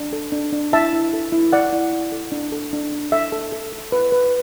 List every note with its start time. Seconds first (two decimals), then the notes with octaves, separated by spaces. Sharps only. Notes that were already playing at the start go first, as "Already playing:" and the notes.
Already playing: D4
0.13 A4
0.32 D4
0.52 D4
0.72 E4 E5 A5
0.93 E4
1.13 A4
1.32 E4
1.52 E4 D5 F#5
1.73 E4
1.93 E4
2.12 A4
2.32 D4
2.52 A4
2.73 D4
2.92 D4
3.12 A4 E5
3.32 A4
3.52 A4
3.72 A4
3.92 B4
4.12 B4